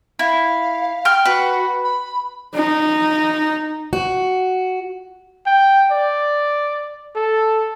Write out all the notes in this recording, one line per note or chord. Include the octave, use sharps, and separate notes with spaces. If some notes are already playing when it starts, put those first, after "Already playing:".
E4 F5
G5 F6
F#4 B4
B5
D#4
F#4
G5
D5
A4